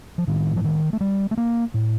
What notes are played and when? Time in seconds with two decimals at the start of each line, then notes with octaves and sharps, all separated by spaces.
0.18 F3
0.27 A2 D#3
0.56 F3
0.64 D#3
0.93 A3
1.01 G3
1.31 A3
1.37 A#3
1.74 A2